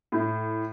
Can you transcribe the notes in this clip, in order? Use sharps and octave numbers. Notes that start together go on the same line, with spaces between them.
A2